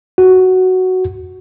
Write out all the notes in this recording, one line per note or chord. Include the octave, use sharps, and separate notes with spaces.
F#4